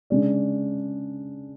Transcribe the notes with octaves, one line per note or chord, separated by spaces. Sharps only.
C#3 G#3 D4